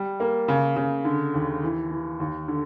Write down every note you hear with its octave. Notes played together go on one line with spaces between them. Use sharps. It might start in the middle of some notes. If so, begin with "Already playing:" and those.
Already playing: G3
A#3
C#3
C#3
D3
D#2
E3
E3
D#2
D3